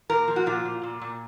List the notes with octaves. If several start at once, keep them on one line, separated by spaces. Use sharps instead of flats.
A#2 A#4
F3
F#4
A#2 F4
A#2
A#2
A#2